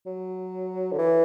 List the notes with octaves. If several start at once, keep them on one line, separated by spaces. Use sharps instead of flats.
F#3
D3
E3